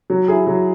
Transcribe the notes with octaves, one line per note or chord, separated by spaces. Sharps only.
F#3
E4 G#4
F#3